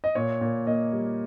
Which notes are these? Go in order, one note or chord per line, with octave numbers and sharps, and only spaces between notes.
D#5
A#2 C#5
A#2
A#3 D#5
G3